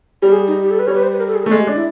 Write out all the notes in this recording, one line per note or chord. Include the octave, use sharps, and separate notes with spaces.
G3 G4
G#4
D#4
G4
A4
B4
G3 C#5
B4
C5
B4
A#4
A4
G#4
A#4
A3
G#3 A4
G4
D4
E4